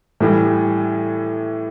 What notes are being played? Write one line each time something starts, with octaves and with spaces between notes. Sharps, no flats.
A2 E3 G3